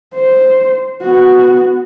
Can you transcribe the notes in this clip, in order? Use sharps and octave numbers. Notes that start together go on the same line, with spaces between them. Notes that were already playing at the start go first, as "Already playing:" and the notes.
C5
B3 F#4